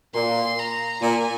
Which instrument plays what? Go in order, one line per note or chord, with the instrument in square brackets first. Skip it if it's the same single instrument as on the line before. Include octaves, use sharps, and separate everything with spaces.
[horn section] A#2 [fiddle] C6
[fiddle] A#5
[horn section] A#2 [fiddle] G#5